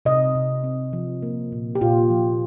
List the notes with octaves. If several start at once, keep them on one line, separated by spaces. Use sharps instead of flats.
C3 D#5
C3
C4
F3
A#3
A#2
G4
A#2 F4
F3